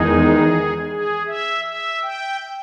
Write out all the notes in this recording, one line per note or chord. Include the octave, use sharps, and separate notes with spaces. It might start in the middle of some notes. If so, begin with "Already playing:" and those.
Already playing: E2 D#3 G#3 D#4 G#4
G#4
E5
E5
G5